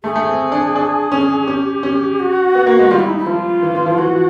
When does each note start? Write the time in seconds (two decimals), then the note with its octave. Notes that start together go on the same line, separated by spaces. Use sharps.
0.04 A3 G#4
0.16 A3
0.27 C4
0.52 D4
0.76 D4
1.12 C#4
1.47 C#4 G4
1.83 C#4
2.19 F#4
2.55 B3
2.66 A#3
2.79 G#3
2.91 G3 F4
2.99 E4
3.09 D#4
3.18 E4
3.26 F3 F4
3.62 E3
3.75 E3
3.86 F3
3.98 E3 F#4